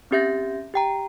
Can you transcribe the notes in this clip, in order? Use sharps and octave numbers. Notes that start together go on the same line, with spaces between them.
C4 C#4 G4 E5 G6 A#6
G4 G5 A#5